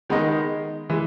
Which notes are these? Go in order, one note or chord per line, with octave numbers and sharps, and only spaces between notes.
D#3 G#3 B3 D#4
E3 G#3